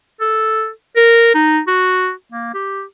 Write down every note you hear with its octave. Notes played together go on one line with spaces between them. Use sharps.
A4
A#4
D#4
F#4
A#3
G4